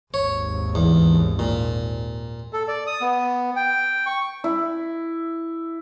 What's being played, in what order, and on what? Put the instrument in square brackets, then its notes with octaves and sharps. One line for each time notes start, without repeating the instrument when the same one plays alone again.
[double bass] G#1 D#2 [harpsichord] C#5
[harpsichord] E2
A#2
[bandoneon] A4
D5
D#6
B3
G5
C#6
[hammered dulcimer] E4